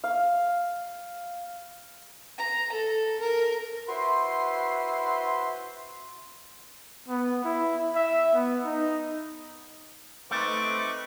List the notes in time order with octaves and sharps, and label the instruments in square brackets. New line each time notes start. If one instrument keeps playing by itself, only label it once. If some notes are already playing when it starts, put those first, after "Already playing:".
[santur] F5
[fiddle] A#5
A4
A#4
[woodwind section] E4 F#4 B4 C5 B5 C6
[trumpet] B3
E4
E5
B3
D#4
[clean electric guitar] A3 [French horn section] C4 D#4 C5 [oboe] B4 [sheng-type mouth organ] C#6 D6